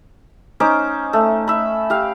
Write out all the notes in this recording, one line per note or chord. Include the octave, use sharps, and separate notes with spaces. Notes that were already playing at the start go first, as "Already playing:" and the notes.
C#4 D#4 C5 D6
A3
E5 B5
G4 F5